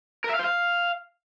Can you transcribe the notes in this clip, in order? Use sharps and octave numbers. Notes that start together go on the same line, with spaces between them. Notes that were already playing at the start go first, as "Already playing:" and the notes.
A#4
E5
F5
C5
F5